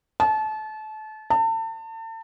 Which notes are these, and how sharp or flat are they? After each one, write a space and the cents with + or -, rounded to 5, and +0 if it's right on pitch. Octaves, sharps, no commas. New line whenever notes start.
A5 -30
A5 +35